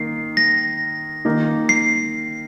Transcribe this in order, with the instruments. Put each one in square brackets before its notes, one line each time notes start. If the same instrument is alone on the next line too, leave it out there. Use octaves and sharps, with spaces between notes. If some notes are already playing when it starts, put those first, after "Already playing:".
Already playing: [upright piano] D#3 A#3 [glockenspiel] C7
[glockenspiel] A#6
[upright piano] D#3 A#3 D#4
[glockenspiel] C7